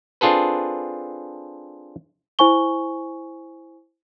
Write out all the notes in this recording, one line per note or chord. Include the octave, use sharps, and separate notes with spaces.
C4 D4 F4 G#4 A4 B4
E4 C5 G#5 C#6 G7